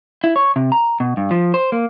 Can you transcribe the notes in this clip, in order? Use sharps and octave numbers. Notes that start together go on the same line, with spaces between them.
E4
C#5
C3
A#5
B2
G2
F3
C5
A#3